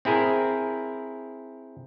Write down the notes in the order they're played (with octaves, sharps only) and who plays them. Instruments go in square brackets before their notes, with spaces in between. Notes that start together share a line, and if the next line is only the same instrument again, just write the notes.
[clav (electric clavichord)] C4 E4 G#4 A#4